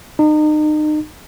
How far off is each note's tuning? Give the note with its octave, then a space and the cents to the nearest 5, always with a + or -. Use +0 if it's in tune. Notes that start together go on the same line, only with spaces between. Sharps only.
D#4 -35